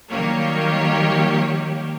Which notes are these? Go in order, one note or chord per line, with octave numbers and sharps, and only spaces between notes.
D#3 F#3 G3 A#3 G4 C#5